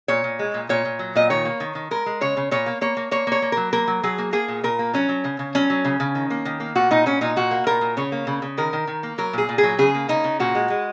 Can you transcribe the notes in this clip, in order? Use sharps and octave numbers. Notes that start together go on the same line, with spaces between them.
A#2 C#5
A#2
G#3
A#2
A#2 C#5
A#2
F#3
A#2 D#5
D#3 C#5
A#3
D#3
D#3
G#3 A#4
G#3
C#3 C#5
C#3
A#2 C#5
A#3
A#3 C#5
A#3
A#3 C#5
A#3 C#5
A#3
F#3 A#4
A#3 A#4
F#3
F#3 G#4
A#3
A#3 G#4
A#2
A#2 A#4
A#3
F#3 C#4
F#3
C#3
C#3
F#3 C#4
F#3
C#3
C#3
D#3
A#3
D#3
A#3
A#2 F#4
A#2 D#4
A#2 C#4
A#2 D#4
A#2 F#4
A#3
A#2 A#4
A#2
C#3 C#5
A#3
C#3
C#3
D#3 A#4
D#3
D#3
A#3
F#3 A#4
A#2 G#4
A#2
G#4
F#3
C#3 G#4
A#3
C#3 D#4
C#3
A#2 F#4
G#3
G#3